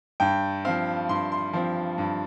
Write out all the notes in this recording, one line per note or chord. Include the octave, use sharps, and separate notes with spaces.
G2 G5
F3 C4 F5
G2 C6
C6
F3 C4
G2